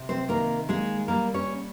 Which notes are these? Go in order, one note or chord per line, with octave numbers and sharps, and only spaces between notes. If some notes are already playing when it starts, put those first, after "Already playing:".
Already playing: C3
C4 C5
D#3 A#3 A#4
G#3 A#3 G#4
G3 A#3 A#4
C#4 C#5